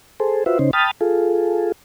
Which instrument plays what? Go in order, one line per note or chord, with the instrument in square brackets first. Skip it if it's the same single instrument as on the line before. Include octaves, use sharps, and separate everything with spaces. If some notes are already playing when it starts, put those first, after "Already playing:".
[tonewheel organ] G#4 A4 C5
F4 F#4 B4 C5 E5
C#3 C#4 D#4 C5
G5 A5 B5 D#6 F6 A6
F4 G#4 A4